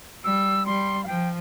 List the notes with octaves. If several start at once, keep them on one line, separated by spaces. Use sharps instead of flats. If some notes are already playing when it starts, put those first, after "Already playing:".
G3 E6
G3 C6
F5
F3 G5